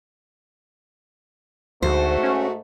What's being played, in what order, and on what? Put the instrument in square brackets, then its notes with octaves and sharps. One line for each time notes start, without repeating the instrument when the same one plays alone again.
[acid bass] D2 [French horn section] G#2 A3 [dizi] F#4 [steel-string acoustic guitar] C5
[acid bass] C#4